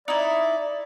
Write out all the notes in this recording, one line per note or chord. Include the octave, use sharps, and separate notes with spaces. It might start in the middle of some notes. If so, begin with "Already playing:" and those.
D#4 E4 D5